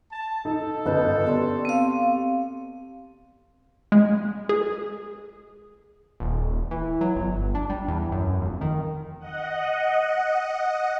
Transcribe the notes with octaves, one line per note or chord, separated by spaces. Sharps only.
A5
D#4 A4
G1 F#2 C#4 B4 D#5 G6
B3 G4 D5 C6
C4 F5
G#3
G#4
D#1
E3
F#3
G1
D4
G3
E2
F#2
F1
D#3
D#5 F#5